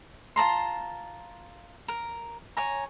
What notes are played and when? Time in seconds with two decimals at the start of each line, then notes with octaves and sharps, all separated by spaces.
0.36 F4 A5 A#5 C6
1.88 A#4
2.57 C#5 G#5 A#5